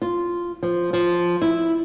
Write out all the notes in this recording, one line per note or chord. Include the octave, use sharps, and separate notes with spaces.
F4
F3
F3
E4